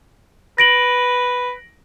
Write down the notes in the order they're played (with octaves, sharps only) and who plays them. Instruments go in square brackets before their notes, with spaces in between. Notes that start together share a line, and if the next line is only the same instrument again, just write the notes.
[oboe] B4 [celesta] A#6 D7 F#7